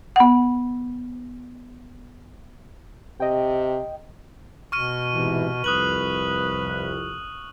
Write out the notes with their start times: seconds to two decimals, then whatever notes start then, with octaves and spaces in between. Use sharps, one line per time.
0.16 B3 F#5
3.20 C3 D#5 G5
4.72 B2 C#6 F6 D#7
5.13 G#2 C3 E3
5.64 C2 F2 B4 D#6 F#6 F#7